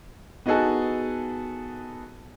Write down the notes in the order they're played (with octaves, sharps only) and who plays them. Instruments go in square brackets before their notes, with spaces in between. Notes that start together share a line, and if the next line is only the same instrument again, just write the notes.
[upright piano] B3 D#4 F#4 G#4 A4